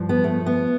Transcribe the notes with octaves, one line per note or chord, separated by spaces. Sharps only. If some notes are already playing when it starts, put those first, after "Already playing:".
Already playing: G2 F3
B3
A3
B3